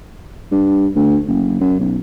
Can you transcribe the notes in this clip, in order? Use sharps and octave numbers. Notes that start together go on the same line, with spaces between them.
G2
D2
F#1
F#2
B1